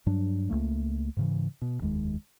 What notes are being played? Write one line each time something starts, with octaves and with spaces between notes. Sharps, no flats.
G2 F#3 D4
C#2 A3 A#3
G#2 C#3 E3
B2
F1 D#2 G#3